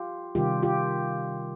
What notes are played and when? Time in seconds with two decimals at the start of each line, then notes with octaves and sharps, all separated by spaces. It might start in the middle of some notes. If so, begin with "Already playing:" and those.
Already playing: F4 G4
0.35 C3 D#3 G3 F4 G4
0.63 F4 G4